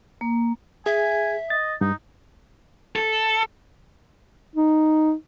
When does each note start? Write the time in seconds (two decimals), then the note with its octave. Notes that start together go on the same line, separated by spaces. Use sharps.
0.21 A#3
0.86 G#4 E5 G#5
1.50 D#5 A6
1.81 G2 D#4
2.96 A4
4.56 D#4